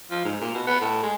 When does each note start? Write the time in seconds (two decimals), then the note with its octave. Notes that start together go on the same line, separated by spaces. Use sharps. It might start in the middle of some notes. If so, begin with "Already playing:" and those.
0.11 F3
0.24 G#2
0.41 A#2
0.54 B2
0.67 B3
0.81 A2
1.03 G#3